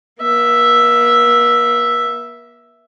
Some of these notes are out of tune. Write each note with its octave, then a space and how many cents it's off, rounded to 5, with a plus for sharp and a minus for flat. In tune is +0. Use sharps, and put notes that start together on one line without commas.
A#3 +45 E5 +0